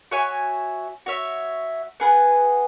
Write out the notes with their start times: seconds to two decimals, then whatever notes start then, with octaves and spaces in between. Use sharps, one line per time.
0.11 F#4 C#5 E5 G#5
1.06 F#4 C#5 E5
2.00 B3 G#4 B4 F#5